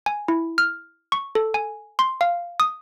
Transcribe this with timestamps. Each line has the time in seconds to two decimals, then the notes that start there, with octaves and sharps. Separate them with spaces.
0.06 G#5
0.28 E4
0.58 F6
1.12 C#6
1.35 A4
1.54 G#5
1.99 C6
2.21 F5
2.60 D#6